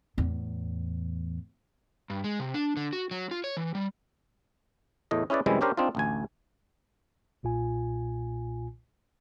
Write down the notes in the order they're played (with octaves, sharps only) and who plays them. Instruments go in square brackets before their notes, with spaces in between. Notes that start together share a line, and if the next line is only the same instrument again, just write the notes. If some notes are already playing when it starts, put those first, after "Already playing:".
[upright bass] E2 A2
[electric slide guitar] G2
G#3
C3
D4
D3
F#4
F#3
F4
C#5
E3
G3
[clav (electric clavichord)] E2 A2 A3 D#5
C#4 E4 G#4 B4 D5
F#2 C3 E3 G3 G#3 E4
C#4 D4 G4 A#4 C5
C4 D4 D#4 F4
A1 D2 G#5
[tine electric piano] B1 A#2 F4 G#5